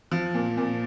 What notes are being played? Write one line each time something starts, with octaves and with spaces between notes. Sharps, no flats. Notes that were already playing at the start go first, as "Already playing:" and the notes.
F3
A#2
A#2